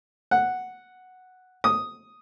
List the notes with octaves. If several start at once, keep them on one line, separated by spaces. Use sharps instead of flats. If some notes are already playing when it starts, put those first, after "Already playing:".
F#5
D#6